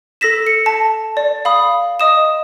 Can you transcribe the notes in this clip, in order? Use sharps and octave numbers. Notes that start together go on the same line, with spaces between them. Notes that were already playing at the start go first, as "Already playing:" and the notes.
A4 E6 A#6 B6 E7
C#7
A5
D5
F5 B5 D#6
D#5 D#6 E7